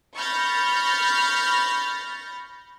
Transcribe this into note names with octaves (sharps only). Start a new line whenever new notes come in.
B5 C#6 F6 G6 A6 A#6